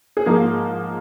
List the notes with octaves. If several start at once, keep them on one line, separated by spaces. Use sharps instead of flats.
G#4
G#2 F3 G#3 A#3 A#4